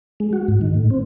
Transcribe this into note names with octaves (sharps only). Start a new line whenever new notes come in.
G#3
F#4
G#2
D#3
A2
C4